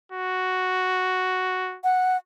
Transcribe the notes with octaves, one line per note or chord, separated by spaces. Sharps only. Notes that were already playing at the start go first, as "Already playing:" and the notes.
F#4
F#5